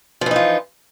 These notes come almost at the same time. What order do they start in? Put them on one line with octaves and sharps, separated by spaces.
F3 E3 D#4 F4